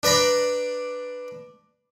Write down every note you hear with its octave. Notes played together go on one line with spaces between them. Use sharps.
D4 B4 D5 A#5 B5